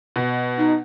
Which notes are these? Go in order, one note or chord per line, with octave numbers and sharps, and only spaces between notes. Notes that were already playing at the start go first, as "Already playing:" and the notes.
B2
D#4